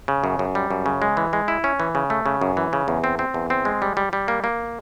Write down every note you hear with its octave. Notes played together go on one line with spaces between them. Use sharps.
C#3
F#2
F#2
G3
F#2
C#3
G#3
E3
G#3
E4
C#4
E3
C#3
A3
C#3
F#2
E3
C#3
E2
C4
C4
E2
C4
G#3
G3
G3
G3
A#3
A#3